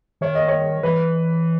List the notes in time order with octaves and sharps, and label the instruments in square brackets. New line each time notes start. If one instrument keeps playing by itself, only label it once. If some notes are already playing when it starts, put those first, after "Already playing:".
[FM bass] D#3 [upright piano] C#5
[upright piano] D#5
C#5
[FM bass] E3 [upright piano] B4